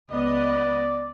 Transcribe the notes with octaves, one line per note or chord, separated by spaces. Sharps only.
C#2 B3 D5 D#5